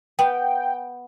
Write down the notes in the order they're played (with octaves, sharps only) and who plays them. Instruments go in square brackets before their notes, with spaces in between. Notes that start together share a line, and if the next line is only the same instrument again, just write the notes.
[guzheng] B3 [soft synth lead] G5